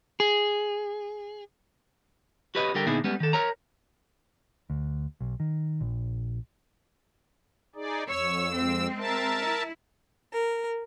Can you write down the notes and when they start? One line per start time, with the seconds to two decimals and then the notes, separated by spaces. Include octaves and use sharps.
0.20 G#4
2.55 F#4 G4 B4 C#5 D#5
2.75 D3 G3 A#4 G5
2.87 A#2 D3 B3 D#4 E4 G#4
3.04 G3 G#3 B3 C#4
3.20 D#3 A4
3.33 A#4 C#5 A#5
4.70 D2
5.21 B1
5.40 D#3
5.81 A#1
7.75 D#4 G#4 D5
8.08 F2 C#5 E6
8.54 G#3 C4
8.98 A#4 E5 A5
9.41 E4
10.33 A#4